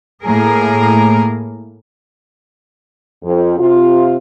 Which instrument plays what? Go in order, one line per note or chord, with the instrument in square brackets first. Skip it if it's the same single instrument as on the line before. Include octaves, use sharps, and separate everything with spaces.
[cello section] A2 A#3 G#4 A#4
[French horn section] F2
C3 F4